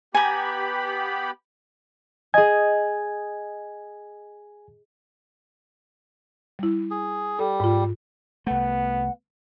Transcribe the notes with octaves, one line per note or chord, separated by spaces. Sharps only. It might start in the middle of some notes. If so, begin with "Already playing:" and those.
B3 G4 G#5 A#5 B5
G#4 D#5 G#5 G#6
G3 E4
G#4
G3 A4
G#2 F4
C2 A3 B3 F#5